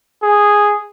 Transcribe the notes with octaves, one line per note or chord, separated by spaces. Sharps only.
G#4